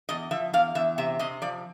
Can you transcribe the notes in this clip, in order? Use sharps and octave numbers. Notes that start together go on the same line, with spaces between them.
E2 D#5
F3 E5
E2 F5
E2 E5
C3 E5
C3 D#5
F3 D5